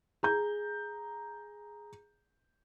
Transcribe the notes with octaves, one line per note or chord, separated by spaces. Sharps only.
G#4 A#5 G6